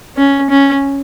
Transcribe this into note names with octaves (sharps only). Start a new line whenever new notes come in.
C#4
C#4